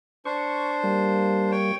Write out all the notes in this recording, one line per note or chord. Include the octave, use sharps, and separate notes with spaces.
D4 C5 C#6
G3 A#3
C#5 G5